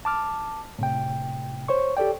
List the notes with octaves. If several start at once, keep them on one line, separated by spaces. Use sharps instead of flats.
A5 D6 F6
A2 C3 G5
C5 C#5 C#6
G4 A4 D5 G5